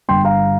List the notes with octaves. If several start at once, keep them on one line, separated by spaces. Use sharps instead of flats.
G1 G2 G3 G5 C6
F5 A#5